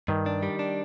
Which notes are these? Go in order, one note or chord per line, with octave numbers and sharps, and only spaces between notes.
G2 D#3
D4
G3
D4